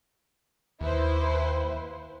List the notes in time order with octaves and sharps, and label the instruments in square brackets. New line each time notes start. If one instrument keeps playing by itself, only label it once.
[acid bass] D#2 [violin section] E4 B4 C5